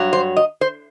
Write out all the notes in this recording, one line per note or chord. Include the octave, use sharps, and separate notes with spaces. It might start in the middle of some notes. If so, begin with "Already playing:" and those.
Already playing: G2 F#3
C5
D#5
C5